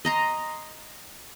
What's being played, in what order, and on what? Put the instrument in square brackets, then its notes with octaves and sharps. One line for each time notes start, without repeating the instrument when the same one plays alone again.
[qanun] D#5 A#5 C6